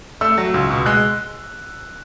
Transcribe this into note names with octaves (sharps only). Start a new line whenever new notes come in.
A3 E6
F#3
C#2
B2
G#3 F#6